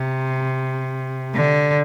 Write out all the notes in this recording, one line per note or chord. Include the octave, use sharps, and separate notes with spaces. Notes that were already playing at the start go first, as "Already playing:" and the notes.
Already playing: C3
D3